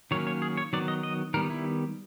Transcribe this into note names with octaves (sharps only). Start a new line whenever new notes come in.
D#3 F#3 A#3 C#4 C#5
C#5
G#4
C#5
D#3 F#3 B3 D5
D#5
D#5
D#3 G3 B3 A#4
E4